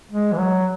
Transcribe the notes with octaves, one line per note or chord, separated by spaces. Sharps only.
G#3
E3
F#3